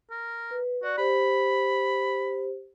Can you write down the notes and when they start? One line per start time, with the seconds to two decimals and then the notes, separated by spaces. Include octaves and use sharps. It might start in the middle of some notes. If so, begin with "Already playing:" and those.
0.10 A#4
0.51 B4
0.83 F#4 D5
0.98 G4 C5 B5